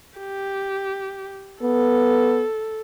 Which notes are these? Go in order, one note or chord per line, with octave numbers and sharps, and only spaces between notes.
G4
B3 A4